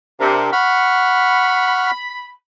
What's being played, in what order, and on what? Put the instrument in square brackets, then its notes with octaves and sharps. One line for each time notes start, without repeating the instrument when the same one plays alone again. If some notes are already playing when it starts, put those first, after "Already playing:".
[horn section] C3 [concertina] D4 A#4
[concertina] F#5 C#6 F6 [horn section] B5